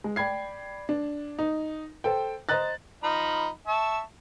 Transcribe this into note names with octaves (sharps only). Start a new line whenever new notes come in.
G#3
D5 G5 B5 G#6 C7
D4
D#4
A4 C5 G5
C5 D#5 A#5 F#6 A6
F3 D#4 B5
E5 A5 C#6